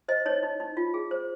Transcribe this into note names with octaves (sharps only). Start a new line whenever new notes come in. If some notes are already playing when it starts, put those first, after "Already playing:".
C5 D#5
D#4 C#5
D#4
D#4
F4
G#4
C5